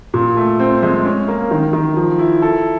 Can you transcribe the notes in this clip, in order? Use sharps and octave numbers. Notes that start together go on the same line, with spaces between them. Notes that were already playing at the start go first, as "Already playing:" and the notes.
A#2
A3
C4
G#3
C#4
A#3
D#3
D#3
F3
E4
A4